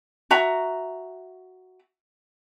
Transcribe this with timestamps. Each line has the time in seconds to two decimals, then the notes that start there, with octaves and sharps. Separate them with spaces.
0.31 F#4 E5 A#5